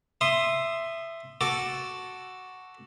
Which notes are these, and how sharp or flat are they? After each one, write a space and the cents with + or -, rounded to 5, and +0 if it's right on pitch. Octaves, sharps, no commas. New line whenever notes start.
E5 +10 C6 +0 D#6 -15
F#4 +0 A4 +0 D6 +0